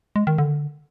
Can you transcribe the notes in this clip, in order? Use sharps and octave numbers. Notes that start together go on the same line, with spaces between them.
G#3
D#3
D3